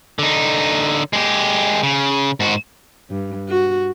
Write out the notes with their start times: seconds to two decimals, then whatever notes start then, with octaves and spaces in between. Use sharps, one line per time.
0.19 D3 D#4
1.13 G#3 G4
1.83 C#3
2.40 G#2 F#4
3.11 G2
3.49 F#4